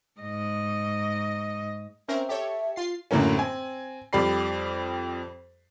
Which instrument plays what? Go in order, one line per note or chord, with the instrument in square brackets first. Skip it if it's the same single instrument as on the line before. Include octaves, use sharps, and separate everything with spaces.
[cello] G#2 D#5
[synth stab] C4 C#4 A#4 [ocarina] E5
[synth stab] G4 A4 C#5 [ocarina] E5
[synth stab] F4 A6 C7
[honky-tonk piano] F#2 A2 D3 F#3 A#3 C#4
C4 G#5
F2 G3 G4 D5 B5 C7